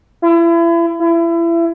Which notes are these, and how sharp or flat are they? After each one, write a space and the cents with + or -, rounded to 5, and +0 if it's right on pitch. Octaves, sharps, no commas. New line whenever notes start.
E4 +35
E4 +30